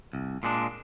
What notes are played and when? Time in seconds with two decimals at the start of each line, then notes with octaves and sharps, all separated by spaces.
0.13 C2
0.43 A#2 G#3 D4